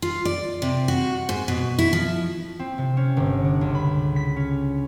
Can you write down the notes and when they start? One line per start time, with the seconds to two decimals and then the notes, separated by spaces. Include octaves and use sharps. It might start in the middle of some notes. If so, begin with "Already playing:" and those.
0.02 F4
0.25 D5
0.62 C3
0.88 F#4
1.29 G#2
1.48 B2
1.79 E4
1.93 F3
2.59 C4
2.78 C3
2.97 C#4
3.17 G1
3.44 D4
3.61 C#2
3.75 B5
4.16 B6
4.36 C#4